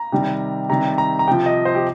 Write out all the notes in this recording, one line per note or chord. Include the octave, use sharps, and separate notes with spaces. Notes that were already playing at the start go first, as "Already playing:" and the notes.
Already playing: A#5
C3 D#3 G3
C3 D#3 G3 A#5
A#5
A#5
C3 F3 G5
D#5
C5
G4